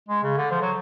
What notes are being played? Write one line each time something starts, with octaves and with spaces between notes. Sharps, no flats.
G#3
C#3
D3
F3
F#3